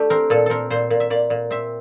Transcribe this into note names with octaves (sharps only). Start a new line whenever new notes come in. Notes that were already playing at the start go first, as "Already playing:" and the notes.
Already playing: A3 D4 G4
C4 A#4
A#2 A4
C4 A4 A#4
A#2 C5
A#2
E5
A#2 D5
A#2
C4 E5